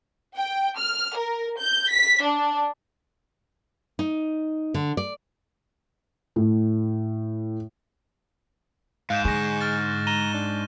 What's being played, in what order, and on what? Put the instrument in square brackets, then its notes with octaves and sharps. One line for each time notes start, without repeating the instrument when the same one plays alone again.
[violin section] G5
F6
A#4
G6
B6
D4
[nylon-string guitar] D#4
D3
D5
[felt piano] A2
[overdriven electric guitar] G#2 [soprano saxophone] F5 [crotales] F#6 G6 E7
[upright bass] D3 [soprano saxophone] G#4 [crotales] C#6 A#6
[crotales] F6 A6
[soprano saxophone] A#5 [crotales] D#7 E7 G7
[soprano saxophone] D4